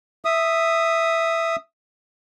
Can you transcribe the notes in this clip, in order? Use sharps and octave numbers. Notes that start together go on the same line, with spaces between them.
E5 D#6